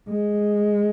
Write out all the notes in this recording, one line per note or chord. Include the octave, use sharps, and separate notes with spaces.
G#3